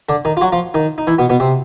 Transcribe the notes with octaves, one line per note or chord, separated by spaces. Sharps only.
D3 D4
D#3 D#4
F4
F#3 F#4
F3 F4
D#3 D#4
D#4
E3 E4
B2 B3
B2 B3
C3 C4